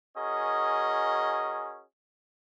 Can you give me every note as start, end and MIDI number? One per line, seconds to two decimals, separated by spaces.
0.17 1.83 61
0.17 1.83 66
0.17 1.83 68
0.17 1.83 70
0.17 1.83 75